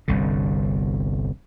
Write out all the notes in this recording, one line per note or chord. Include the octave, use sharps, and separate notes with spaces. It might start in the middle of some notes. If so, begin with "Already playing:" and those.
G1 C2 D3